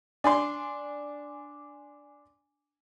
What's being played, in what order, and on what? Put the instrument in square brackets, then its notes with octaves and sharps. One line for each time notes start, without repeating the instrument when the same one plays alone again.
[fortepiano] D4 D5 C6 [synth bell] G#5 D6